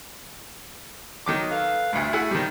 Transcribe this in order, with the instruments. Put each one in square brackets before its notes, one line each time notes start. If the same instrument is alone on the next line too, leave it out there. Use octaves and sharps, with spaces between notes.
[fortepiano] D#3 F#3 D6 [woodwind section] D#5
[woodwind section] A4 B4 F5
[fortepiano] D2 G2 [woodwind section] A3
[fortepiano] E4 G#4 F#5
[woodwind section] A#2 F3 D#4 [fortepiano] D#3 G3